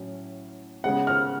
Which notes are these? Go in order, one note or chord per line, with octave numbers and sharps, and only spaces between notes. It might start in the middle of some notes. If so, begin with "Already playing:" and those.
Already playing: A2 F#3 C#4
C#3 G#3 B3 F#5
F6